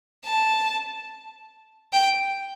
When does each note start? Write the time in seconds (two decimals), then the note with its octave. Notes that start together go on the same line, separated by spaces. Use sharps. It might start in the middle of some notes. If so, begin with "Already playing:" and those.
0.24 A5
1.93 G5